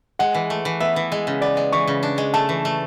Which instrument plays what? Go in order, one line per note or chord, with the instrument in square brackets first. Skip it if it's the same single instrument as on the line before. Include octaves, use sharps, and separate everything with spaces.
[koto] G#3 [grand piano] F#5
[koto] E3
A3
E3
[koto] B3 [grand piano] E5
[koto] E3
G#3
C#3
[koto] B3 [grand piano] D5
[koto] G#3
[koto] E3 [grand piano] C#6
[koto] C#3
D4
G#3
[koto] A3 [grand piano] A5
[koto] E3
A3